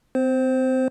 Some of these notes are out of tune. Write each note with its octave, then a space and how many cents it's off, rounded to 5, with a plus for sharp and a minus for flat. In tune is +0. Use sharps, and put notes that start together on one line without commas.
C4 -30 C5 +0